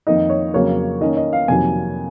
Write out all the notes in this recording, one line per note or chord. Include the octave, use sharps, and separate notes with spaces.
F2 D#3 A#3 D#4 D#5
C#5
F2 C#3 F#3 A#3 C#5
D#3 A#3 C#4 D#5
D#5
F5
F2 C3 D#3 F#3 A#3 G#5